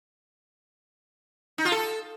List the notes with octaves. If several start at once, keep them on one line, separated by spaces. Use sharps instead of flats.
D#4
F4
A4